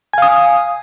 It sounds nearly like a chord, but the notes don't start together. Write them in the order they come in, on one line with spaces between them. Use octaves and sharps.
G#5 F5 D#6